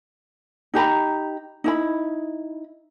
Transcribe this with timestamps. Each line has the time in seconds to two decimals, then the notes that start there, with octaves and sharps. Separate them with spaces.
0.74 D#4 G4 A#5 B5
1.64 D#4 E4 B5